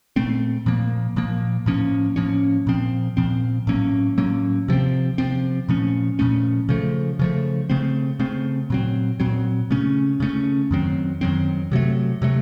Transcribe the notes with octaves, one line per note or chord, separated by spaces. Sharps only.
A#2 A3 C4
A#2 F3 A#3
A#2 F3 A#3
A2 F3 A#3 C#4
A2 F3 A#3 C#4
A#2 F3 C4
A#2 F3 C4
A2 F#3 A#3 C#4
A2 F#3 A#3 C#4
C3 F3 C4
C3 F3 C4
A#2 F3 A3 C#4
A#2 F3 A3 C#4
C#3 F3 A3
C#3 F3 A3
C#3 A3 C4
C#3 A3 C4
A#2 F#3 C4
A#2 F#3 C4
C#3 A3 C#4
C#3 A3 C#4
F#2 D#3 F#3 C4
F#2 D#3 F#3 C4
C3 F#3 A3
C3 F#3 A3